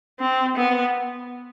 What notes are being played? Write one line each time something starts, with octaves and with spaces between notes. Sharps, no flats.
C4
B3